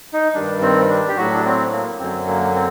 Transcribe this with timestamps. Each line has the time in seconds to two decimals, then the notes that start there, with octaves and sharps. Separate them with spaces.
0.13 D#4
0.34 G2 D#3 G3 D4
0.62 C4
0.89 D4
1.08 G4
1.17 A2 F#3 F#4
1.33 D4
1.45 C4
1.72 A#3
2.00 F#2 D3 F#3 C4
2.28 A#3
2.55 C4